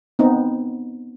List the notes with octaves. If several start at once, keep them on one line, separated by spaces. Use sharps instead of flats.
B3 C4 D#4